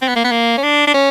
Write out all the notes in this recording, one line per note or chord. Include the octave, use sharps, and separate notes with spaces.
C4
B3
A#3
B3
A#3
C#4
D4
D4
C#4